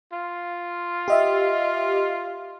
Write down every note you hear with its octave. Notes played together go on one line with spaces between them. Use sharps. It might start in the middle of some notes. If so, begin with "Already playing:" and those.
F4
G4 D#5 E5